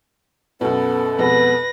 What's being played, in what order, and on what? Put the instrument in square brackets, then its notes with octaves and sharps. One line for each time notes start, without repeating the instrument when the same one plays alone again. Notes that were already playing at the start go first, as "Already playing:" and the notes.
[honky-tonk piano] F#2 B2 [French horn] B3 [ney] A4
[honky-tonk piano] F2 B2 G#3 [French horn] B3 [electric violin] B4 A#6